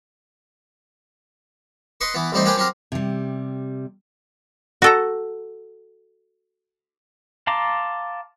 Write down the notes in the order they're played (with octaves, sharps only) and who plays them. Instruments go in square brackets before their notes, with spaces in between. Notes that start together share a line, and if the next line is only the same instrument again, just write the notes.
[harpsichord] B4 D#5 C6 C#6
E3 B3
A1 G3 C4 D#4 C5
A#3 G4 G#4 B4 C5 G5
F#3 C4 G4 A#4
[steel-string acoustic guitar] C3 G3
[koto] F#4 A4 A#5
[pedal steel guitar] F5 A5 A#5 C6 D6